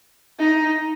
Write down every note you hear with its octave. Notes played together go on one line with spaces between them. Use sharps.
D#4